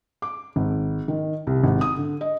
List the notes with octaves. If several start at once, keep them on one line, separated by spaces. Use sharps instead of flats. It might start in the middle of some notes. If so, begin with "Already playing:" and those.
D6
G#1
D#3
C2
G#1
D#6
D3
D#5